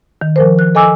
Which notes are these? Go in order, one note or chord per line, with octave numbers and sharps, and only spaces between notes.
D#3
F3 A#4 C5
F#6
A4 D#5 G#5 D6 E6